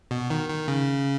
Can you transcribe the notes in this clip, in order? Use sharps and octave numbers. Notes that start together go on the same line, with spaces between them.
B2
D#3
D#3
C#3